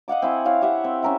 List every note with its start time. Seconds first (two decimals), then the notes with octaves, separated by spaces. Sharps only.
0.08 D#5 F5 F#5 D6
0.22 C4 E4 G#5
0.45 E4 C#5 F5
0.61 G4 E5 F#5
0.84 C4
1.03 C#4 A#4 E5